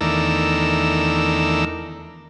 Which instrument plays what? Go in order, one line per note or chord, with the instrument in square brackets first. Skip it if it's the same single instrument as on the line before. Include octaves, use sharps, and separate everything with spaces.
[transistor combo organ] E2 D#3 A3 D4 A#4 E6